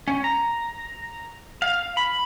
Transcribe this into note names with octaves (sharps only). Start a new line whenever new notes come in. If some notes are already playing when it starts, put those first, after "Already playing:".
C#4
A#5
F5
B5